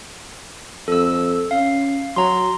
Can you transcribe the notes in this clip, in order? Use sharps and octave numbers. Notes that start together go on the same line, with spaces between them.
F2 A4 E6
C#4 F5
F#3 A#5 C6